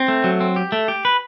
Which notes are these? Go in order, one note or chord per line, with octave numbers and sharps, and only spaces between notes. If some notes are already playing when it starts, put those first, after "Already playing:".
Already playing: C4
A3
F#3
C4
G4
A3
G4
B4